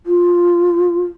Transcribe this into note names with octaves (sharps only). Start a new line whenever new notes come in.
F4